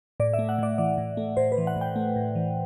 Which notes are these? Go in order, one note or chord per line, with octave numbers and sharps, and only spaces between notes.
A2 D5
E5
A3
F#5
A2 D5
E3 D5
A2
A3
A2 C5
B4
E3
F#5
A2
G5
A3
A2
E3